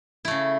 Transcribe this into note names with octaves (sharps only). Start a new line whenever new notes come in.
C#3 A3 E4